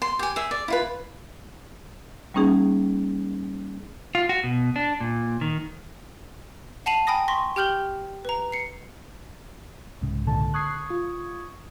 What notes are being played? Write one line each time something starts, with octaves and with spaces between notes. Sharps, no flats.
C6
G4 G#5
G#4 E5
D5
E4 F4 B4
G3 A#3 C#4 D#4 G#4
F4
F#4
B2
D4
A#2
D#3
F#5 A5 C7 D#7 F7 F#7
G5 G#5 B5 D#6 A#6
C6 C#6 A#6 B6
G4 G5 F6 G6 F#7 G7
B4 A#5
C7 C#7
C2 G#2 C#3
A#2 D3 A5
C#6 D#6 F#6 G#6 C7
F4